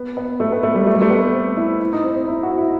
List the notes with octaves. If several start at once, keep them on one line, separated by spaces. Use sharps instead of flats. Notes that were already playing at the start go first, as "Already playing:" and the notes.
Already playing: B3
B3
A3
B3
A3
G3
A3
G3
A3
B3
C4
E4
E4
D#4
C4
C4
E4
F#4
E4